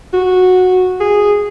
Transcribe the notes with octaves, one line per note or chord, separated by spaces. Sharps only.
F#4
G#4